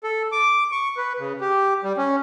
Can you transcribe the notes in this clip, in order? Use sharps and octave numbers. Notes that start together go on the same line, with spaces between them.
A4
D6
C#6
B4
C#3
G4
G3
C#4